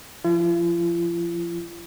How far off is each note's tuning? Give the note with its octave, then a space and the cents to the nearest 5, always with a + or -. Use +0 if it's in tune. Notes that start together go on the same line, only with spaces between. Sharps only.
F3 -10 F4 -45